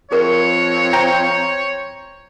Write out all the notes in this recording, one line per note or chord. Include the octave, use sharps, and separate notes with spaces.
F2 G#4 A#4 C#5
C5 G5 A#5